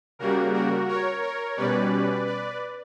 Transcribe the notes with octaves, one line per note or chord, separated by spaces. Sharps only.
C#3 G3 A#3 F#4 A#4
F#4 A#4
A#4 C#5
A#4 C#5
B2 G3 C#4 B4 D5
B4 D5